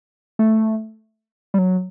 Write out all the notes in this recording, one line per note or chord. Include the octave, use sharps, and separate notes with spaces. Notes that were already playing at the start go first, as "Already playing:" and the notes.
A3
G3
F#3